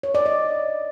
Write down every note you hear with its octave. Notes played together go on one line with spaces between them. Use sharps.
C#5
D5
D#5